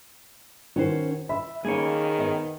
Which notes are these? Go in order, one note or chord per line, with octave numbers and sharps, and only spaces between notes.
D#3 C#4 F#4 C5
E5 B5
D#3 A#3 G#4 C#5
B3 D#5 G#5